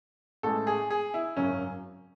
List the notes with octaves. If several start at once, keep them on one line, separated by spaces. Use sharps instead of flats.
A1 A2 G#3 A4
G#4
G#4
E4
G#1 F#2 C#3 F#3 C#4